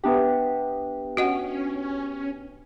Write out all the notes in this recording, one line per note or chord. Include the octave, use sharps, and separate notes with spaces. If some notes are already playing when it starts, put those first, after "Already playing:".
B3 D4 G4 B4 E5 G5
C#4 F#4 D#5 F#5